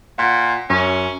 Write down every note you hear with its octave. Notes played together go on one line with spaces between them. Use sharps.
A#2 F#5
F#2 C#4